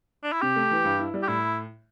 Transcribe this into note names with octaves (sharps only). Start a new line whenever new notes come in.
D4
E4
C3 G4
A3
E3
G2
E4
G3
G4
A2 E4